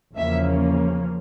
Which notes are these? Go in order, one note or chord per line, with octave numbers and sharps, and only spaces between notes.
E2 C#3 F3 A#3 C#4 E5